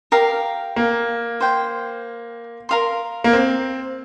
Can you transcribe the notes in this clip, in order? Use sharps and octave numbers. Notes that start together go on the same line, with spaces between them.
G4 A#4 F5
A#3
C5 G5 C6
A#4 F5 C6
A#3
C4